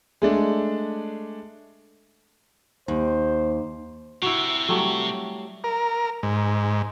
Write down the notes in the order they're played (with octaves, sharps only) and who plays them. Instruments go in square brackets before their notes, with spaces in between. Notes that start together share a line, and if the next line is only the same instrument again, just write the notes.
[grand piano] G#3 A3 D4
[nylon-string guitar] D#2 [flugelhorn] C5
[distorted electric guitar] C3 [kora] E4 F#4
[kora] F#3 G3 A3
[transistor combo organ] A#4
G#2